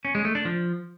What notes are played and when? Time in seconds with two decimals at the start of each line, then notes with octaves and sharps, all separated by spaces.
0.05 C#4
0.15 G#3
0.25 A3
0.35 D4
0.45 F3